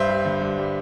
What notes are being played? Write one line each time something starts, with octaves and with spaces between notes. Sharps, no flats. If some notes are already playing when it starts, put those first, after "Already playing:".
Already playing: G2 C5 E5
G3
D3
G2
G3